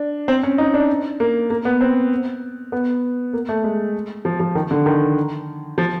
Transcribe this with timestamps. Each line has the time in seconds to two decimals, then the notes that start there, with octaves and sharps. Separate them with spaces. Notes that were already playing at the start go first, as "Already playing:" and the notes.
Already playing: D4
0.28 C4
0.43 C#4
0.58 D#4
0.74 D4
1.20 A#3
1.50 A#3
1.65 B3
1.81 C4
2.72 B3
3.33 A#3
3.49 A3
3.64 G#3
4.25 F3
4.40 F3
4.55 D#3
4.71 D3
4.86 D#3
5.78 F3